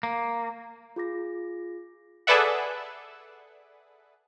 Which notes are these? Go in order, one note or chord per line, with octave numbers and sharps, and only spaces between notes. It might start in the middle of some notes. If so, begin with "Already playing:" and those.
A#3
F4 G#4 D6 A#6
G#4 A4 B4 D5 E5 F#5